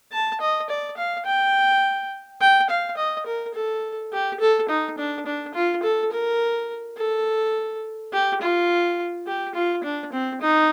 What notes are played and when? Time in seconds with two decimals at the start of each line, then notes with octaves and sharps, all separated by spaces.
0.12 A5
0.41 D#5
0.69 D5
0.97 F5
1.26 G5
2.41 G5
2.70 F5
2.97 D#5
3.26 A#4
3.55 A4
4.13 G4
4.40 A4
4.69 D#4
4.98 D4
5.26 D4
5.55 F4
5.83 A4
6.12 A#4
6.98 A4
8.13 G4
8.42 F4
9.27 G4
9.55 F4
9.84 D4
10.12 C4
10.42 D#4